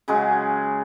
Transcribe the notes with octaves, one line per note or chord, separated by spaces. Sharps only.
C#3 F#3 G#3